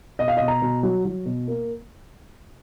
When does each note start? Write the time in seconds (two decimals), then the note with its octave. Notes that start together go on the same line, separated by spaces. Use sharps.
0.19 B2 D#5
0.28 F5
0.37 B2 D#5
0.48 A#5
0.62 B2
0.83 F#3
1.05 F#3
1.26 B2
1.48 A#3